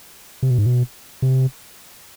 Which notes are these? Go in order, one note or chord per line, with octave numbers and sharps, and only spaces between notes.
C3
B2
G#2
B2
C3